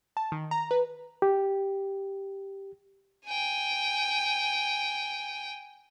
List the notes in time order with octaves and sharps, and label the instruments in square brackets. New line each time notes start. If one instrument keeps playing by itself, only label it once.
[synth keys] A5
D#3
A#5
B4
[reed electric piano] G4
[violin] G5 G#5